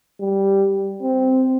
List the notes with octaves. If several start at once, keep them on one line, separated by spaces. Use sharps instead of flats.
G3
C4